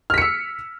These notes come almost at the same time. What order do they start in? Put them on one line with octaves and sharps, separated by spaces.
F6 B6 C#7 E6